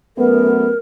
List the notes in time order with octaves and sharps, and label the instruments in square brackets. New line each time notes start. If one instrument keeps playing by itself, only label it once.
[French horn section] F#2 A3 B3 [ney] A#4